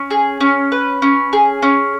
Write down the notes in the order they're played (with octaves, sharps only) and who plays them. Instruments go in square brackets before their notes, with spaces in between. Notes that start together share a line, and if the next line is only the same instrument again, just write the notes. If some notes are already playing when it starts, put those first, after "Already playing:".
Already playing: [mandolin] C#4
G#4
C#4
B4
C#4
G#4
C#4